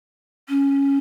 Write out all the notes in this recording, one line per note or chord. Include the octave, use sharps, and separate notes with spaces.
C#4